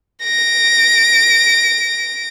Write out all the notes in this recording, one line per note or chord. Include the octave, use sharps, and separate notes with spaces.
A#6 D7